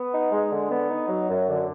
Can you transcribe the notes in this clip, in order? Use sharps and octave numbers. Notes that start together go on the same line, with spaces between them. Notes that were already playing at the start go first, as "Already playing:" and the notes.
Already playing: B3
D#4
G#3
D3
B3
D#4
F#3
F#2
D3